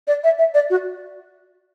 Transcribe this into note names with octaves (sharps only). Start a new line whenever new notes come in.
D5
E5
E5
D5
F#4